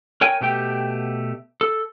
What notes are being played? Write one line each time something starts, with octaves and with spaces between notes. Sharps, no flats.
A#4 C#5 G5 G#5
B2 A3 G4 G5
A4